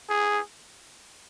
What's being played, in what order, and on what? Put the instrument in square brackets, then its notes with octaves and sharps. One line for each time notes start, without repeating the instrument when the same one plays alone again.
[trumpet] G#4